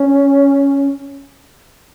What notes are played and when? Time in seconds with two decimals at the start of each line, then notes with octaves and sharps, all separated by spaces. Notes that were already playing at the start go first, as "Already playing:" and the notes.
Already playing: C#4